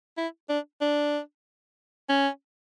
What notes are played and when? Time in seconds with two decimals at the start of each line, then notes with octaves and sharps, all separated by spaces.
0.18 E4
0.49 D4
0.81 D4
2.09 C#4